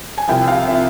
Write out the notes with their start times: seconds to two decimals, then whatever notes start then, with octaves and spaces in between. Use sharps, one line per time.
0.18 G#5
0.28 C2 C3 F3 G5
0.48 F5
0.68 C3 F3 E5